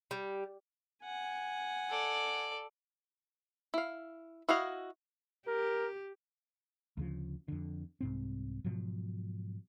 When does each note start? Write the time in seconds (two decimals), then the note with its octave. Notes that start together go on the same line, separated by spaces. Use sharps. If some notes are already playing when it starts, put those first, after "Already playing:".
0.11 G3
1.03 F#5 G#5
1.90 A4 D5
3.74 E4 F5
4.49 E4 F#4 D#5 F5
5.48 G4 A#4
6.97 D2 C#3 F3
7.48 F2 D3
8.01 C2 G#2 C4
8.64 G#2 B2 F3 F#3